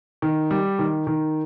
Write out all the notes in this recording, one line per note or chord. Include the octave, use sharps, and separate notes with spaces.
D#3
G3
D#3
D#3